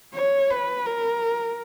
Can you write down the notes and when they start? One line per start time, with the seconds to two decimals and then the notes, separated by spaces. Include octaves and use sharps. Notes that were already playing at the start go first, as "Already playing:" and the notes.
0.14 C#5
0.50 B4
0.86 A#4